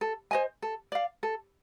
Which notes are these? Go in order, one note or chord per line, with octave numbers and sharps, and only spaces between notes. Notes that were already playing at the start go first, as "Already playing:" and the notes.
A4
C5 D#5 G#5
A4
D5 F5
A4